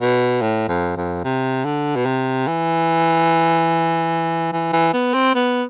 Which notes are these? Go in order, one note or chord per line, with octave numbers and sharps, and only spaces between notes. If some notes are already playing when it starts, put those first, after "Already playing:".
B2
A2
F2
F2
C3
D3
B2
C3
E3
E3
E3
B3
C4
B3